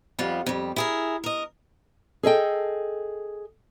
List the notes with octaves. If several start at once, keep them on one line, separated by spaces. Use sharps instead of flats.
F2 F3 G3 F4 F#5
F2 G3
E4 G#4 A#4
A#4 D#5
G#4 A4 D#5 G5